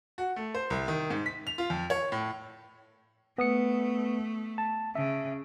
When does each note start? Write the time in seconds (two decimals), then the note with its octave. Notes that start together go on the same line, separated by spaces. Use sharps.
0.18 F#4
0.36 A3
0.55 C5
0.70 C2
0.88 D#3
1.10 G#2
1.26 B6
1.47 F7
1.58 F4
1.70 F2
1.90 C#5
2.12 A2
3.38 A3 B3 D#6 C#7
4.58 A5
4.95 C#3 E5